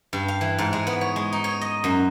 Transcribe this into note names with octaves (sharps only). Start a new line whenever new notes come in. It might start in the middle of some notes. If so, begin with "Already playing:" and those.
G2
F5
E3
G#2
G#3
B3
C#5
G#3
D#4
C#5
D#5
F#2